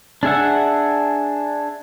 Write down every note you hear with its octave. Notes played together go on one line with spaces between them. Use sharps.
D4 G#4 E5 F#5